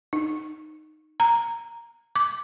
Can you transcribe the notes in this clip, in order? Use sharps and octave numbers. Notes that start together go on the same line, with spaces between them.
D#4
A#5
D6